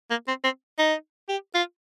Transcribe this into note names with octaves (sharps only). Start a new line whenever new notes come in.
A#3
C4
C4
D#4
G4
F4